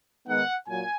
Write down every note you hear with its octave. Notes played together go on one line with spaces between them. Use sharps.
D#3 G#3 B3 D#4 F#5
A#2 F#3 G#5